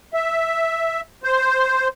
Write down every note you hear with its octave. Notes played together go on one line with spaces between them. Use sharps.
E5
C5